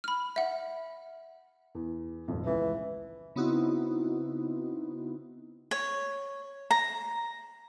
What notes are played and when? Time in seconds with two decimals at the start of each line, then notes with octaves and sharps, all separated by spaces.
0.04 B5 F6
0.36 E5 F#5
1.75 E2
2.28 D#1 G#1 F2
2.47 C#2 E3
3.36 C#3 B3 C4 D#4 E4 F#4
5.71 C#5
6.71 A#5